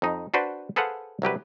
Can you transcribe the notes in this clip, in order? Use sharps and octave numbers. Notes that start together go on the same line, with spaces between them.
F2 D#4
D4 F#4 B4 C5 D5
G#4 A4 B4 C5 F5 F#5
C2 F#3 G4 B4